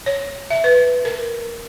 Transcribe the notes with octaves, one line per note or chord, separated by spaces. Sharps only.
C#5
E5
B4
A#4